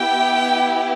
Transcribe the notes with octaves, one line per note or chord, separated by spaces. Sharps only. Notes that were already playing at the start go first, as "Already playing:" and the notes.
Already playing: B3 E4 G4 G5